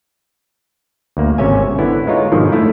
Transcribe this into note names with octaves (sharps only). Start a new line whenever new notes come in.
D2 A#3
G#1 C3 C#4 C#5 E5 G#5
D3 B3 E4
G#3 D#4 F4 C#5
G#2 B2 D3 D#3 F3
A3 E4